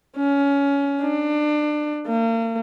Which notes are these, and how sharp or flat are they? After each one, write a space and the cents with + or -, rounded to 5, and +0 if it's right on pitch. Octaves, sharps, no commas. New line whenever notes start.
C#4 +20
D4 +25
A#3 -40